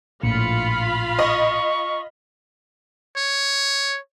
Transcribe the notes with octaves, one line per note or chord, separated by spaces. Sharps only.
A#1 A2 F4 F5 B5 C#7
D#5 C#6
C#5